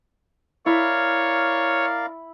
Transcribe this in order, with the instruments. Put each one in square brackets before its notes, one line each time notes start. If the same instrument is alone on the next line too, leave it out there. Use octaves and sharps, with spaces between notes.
[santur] E4 [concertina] A#4 D5 F5 [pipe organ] C#5